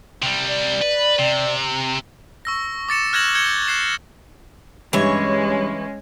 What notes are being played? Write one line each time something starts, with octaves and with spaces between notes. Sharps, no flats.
C3 G3
D5
B4
C3
C#6 E6 A#6
D6 A6 C#7 E7
F6 F#6 G#6 A#6 E7 F#7
G6 G#6 C#7 G7
F#6 A6 C7 E7
G2 E3 G#3 C#4 C#5